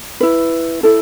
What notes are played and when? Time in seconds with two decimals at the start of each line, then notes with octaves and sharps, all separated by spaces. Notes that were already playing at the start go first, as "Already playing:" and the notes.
0.21 E4 B4
0.83 E4 A4